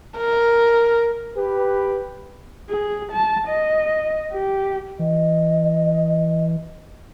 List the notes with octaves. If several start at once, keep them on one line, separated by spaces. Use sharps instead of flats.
A#4
G4 B4
G#4
A5
D#5
G4
E3 D#5